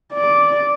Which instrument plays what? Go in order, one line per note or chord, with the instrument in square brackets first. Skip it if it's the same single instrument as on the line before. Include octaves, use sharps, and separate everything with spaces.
[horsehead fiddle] D5